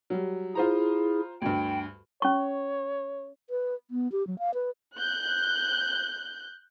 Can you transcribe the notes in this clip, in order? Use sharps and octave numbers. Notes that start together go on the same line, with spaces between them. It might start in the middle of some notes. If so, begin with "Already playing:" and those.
F#3 G3
E4 F4 G#4 C5 A#5
D2 G2 G5
C#4 C#5 C#6
B4
B3
G4
F#3
F5
B4
F#6 G6